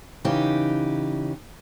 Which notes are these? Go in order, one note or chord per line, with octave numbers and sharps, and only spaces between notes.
C#3 E3 D#4 G4